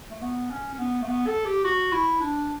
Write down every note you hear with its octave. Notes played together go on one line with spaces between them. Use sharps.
A3
B3
C#4
C#4
B3
A3
B3
A4
G4
F#4
E4
D4